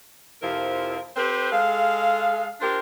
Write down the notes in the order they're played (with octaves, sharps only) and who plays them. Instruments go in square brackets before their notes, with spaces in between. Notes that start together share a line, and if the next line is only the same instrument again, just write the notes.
[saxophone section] F2 C3 F3 E4 A#4
C4 G4 A4 B4 C5
G#3 G#4 A4 F5
D4 F4 G4 A#4 C5